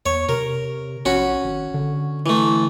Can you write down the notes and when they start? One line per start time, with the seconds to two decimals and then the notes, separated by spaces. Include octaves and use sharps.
0.06 E2 C#5
0.29 C3 A#4
1.06 A#1 C#4 F#4 B5
1.44 G#1
1.74 D3
2.26 E3 A3